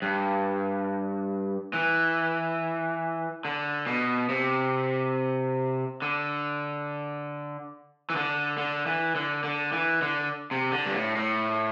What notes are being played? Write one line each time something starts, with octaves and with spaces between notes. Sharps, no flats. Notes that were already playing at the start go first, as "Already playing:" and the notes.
G2
E3
D3
B2
C3
D3
E3
D3
D3
E3
D3
D3
E3
D3
C3
D3
G2
A2
A2